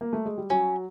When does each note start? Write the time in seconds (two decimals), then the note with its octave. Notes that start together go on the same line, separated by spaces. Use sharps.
0.01 A#3
0.13 A3
0.25 G#3
0.38 G3
0.50 F#3 C#4